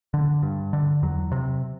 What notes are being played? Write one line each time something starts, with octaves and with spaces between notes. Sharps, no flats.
D3
G2
D3
E2 F#3
C3